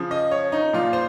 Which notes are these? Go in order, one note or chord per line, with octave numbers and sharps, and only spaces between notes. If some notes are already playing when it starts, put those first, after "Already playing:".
Already playing: C#3 F3
D#5
C#5
D#4
A#2 F3 F4
C5